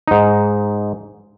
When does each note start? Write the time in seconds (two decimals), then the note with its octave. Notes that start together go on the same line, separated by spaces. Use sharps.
0.08 G#2 D#4